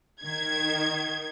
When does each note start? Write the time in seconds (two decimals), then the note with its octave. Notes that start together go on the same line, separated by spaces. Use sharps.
0.23 D#3 G#6